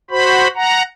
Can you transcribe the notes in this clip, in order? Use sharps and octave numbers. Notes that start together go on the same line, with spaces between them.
F#4 C5 B5
F#5 A#5